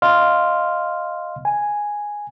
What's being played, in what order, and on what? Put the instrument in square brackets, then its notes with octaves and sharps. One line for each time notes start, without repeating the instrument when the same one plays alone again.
[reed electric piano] D#5 F5 C6 F6
G#5